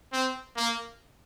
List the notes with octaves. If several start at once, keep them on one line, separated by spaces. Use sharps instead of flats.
C4
A#3